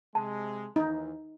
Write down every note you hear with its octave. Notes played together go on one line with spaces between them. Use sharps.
C3 G#3 A5
D#2 E3 D#4